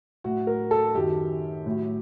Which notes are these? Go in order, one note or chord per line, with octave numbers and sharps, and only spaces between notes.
A2 F#3 F#4
A#4
A4
F#2 D#3 F#3 G4
A2 F#3